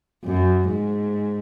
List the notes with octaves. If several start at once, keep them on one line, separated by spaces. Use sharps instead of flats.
F#2
G#2